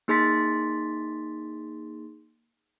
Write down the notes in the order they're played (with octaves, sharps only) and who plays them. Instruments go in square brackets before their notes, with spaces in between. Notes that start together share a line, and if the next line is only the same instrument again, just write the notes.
[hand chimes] A#3 D#4 G#4 C6 A6 B6